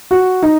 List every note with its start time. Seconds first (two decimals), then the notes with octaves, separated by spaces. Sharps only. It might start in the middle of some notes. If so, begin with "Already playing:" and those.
0.11 F#4
0.43 D#4